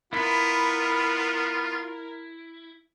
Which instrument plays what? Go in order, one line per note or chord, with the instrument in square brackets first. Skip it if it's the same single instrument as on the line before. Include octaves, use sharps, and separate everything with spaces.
[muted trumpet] B3 [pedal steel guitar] E4 [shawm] F4 [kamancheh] A#4